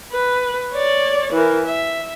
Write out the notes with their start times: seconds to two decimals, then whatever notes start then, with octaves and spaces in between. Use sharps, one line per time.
0.12 B4
0.72 C#5 D5
1.33 E3 A#4
1.66 E5